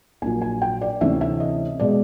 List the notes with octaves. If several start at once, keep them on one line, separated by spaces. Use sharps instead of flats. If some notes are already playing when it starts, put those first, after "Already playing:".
A#1 A#2 F#3 G#5
G#5
G5
D5
D2 C3 E3 A3 C#4 E5
E5
D#5
B2 G#3 D5